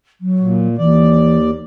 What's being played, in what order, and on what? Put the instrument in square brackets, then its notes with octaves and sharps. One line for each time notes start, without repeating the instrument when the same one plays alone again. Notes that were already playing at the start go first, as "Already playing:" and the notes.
[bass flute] F#3
[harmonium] A#2
[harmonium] D#2 D5 [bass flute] E3